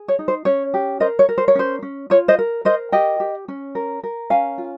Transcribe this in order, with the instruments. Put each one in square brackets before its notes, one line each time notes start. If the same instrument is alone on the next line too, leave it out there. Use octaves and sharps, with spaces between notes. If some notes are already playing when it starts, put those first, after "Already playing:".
Already playing: [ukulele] G#4
C#5
D#4
C5
C#4 C#5
G4
A#4 C5 D#5
C#5
A#4
C5
C#5
C#4 C5
C#4
F4 C#5
C5 D#5
A#4
A#4 C5 D#5
G4 D#5 G5
G4
C#4
A#4
A#4
C#4 F5 G#5
F4